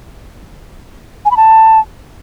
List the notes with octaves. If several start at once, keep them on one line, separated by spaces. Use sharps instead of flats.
G#5
B5
A5